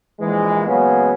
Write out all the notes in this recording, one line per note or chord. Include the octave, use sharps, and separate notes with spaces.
A#1 E3 G#3
C#3 F#3 G#3 A#3 B3 C#4